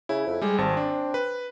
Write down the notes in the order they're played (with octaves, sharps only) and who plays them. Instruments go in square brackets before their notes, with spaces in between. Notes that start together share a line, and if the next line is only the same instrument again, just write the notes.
[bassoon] C#3 [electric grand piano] E4
[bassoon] F2
[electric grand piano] G3 G#3 [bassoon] G#4
[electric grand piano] G#1 A5 [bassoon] C4
[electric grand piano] D4
B4